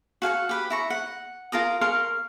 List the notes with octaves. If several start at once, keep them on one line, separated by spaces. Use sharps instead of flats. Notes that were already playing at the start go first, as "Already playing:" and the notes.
F#4 F5 G#5 C#6
G4 B4 G5
E4 A#5 C#6
F#5
F4 A#4 A#5 D#6
A#4 F5 C6 C#6